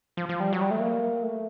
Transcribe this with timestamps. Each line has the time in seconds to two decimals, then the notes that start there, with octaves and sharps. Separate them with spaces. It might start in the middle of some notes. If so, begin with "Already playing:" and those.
0.17 F3
0.29 F3
0.40 G3
0.53 F#3
0.61 G3
0.71 A3
0.80 A#3
1.23 A3